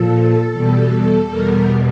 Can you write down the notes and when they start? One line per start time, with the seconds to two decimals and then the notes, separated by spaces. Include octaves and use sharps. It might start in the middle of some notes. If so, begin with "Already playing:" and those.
Already playing: A#2 F3 A4
0.51 E2 B2 G3
1.29 E2 B2 G3 A#4